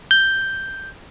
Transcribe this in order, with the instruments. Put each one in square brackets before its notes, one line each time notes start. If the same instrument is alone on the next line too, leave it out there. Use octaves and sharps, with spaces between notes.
[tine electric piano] G6